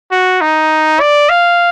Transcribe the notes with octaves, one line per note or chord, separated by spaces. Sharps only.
F#4
D#4
D5
F5